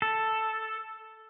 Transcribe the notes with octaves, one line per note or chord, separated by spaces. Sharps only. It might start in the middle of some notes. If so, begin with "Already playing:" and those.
A4